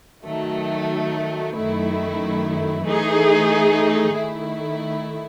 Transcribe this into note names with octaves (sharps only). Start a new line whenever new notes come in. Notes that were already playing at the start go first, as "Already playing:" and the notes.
D#3 F#3 A3
F#2 D#3 A3 E4
E3 A3 D#4 G#4
D#3 A3 E4